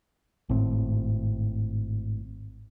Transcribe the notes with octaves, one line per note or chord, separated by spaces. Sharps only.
G#1 A2 C4